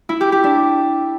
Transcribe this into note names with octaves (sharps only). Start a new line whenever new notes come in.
E4
G4
G4
D4